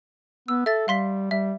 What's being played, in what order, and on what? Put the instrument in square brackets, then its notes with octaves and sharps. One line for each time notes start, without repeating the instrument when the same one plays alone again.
[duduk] B3 [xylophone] E6
[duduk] A4 [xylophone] E5 A6
[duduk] G3 [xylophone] F5 C6 B6
[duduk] G3 [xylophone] E5